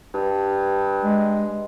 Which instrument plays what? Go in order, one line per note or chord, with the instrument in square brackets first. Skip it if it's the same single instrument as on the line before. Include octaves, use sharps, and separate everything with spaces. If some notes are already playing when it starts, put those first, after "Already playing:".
[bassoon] G2
[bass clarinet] G#3